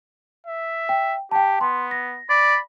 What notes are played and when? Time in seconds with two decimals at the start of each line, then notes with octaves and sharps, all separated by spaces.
0.47 E5
0.89 G5
1.31 G4 G5 A5
1.61 B3 C6
1.91 A#6
2.30 D5 B5